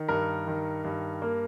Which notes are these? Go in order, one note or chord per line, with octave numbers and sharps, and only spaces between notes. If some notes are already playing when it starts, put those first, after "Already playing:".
Already playing: D#3
G2 A#4
D#3
G2
A#3